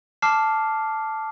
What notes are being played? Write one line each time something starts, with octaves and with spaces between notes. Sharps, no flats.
A5 D6 F6 C7